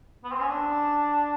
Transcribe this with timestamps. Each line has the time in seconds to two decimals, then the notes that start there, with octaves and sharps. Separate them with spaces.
0.24 B3
0.32 C4
0.40 C#4
0.49 D4